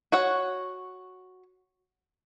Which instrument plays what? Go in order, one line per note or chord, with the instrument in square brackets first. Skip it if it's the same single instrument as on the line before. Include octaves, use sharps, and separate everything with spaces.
[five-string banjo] F#4 C#5 F#5